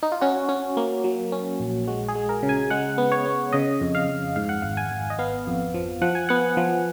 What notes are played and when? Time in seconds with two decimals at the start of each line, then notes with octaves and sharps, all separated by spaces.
0.03 D#4
0.12 F4
0.21 C#4 F#4
0.49 C#4
0.77 A#3
1.04 F#3
1.32 C#4
1.60 A#1
1.87 G#3 F#4
2.08 G#4
2.15 G#3
2.29 A#4
2.43 C#3
2.49 G#5
2.70 G#3 F#5
2.98 B3
3.12 C#5
3.26 B3
3.53 C#3 D#5
3.81 F2
3.95 F5
4.08 F2
4.36 G#2 F5
4.49 F#5
4.62 G#1 F5
4.77 G#5
4.91 G#1
5.10 D#5
5.19 B3 F5
5.47 F2
5.74 F3
6.02 F3 F#5
6.15 G#5
6.29 B3 F#5
6.57 F3